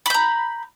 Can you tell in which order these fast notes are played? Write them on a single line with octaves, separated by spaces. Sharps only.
B5 G6 A#5